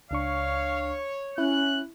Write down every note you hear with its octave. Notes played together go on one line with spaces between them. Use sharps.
C#2 D4 C#5 F5 C#6
C#4 E4 F#6